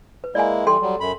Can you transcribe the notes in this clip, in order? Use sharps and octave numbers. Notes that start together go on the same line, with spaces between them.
B4
G#3 A#3 E4 D5 G#5
E3 G3 A4 G5 C6
F#3 G3
F#2 B5